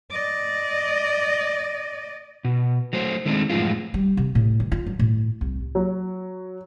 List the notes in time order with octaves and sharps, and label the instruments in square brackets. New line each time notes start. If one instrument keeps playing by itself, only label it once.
[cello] D5 D#5
[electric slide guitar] B2
F#3 A3 C5
D#3 G#3 A3 C4 D4
F#2 A2 C#3 F3 G#3 F4
[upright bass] G3
C3
A2
D#3
F4
F#3
A2
C2
[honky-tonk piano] F#3